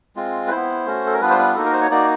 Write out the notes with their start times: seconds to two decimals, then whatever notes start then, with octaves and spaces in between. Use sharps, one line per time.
0.16 G#3 C4 F4
0.47 B4
0.51 B3 E4 C5
0.85 A3 C#4 F#4
1.07 A4
1.14 A#4
1.21 G3 B3 D4 F4 B4
1.30 C5
1.39 B4
1.55 A#3 D#4 F#4 A4
1.65 A#4
1.73 C5
1.81 C#5
1.91 A#3 D#4 F#4 D5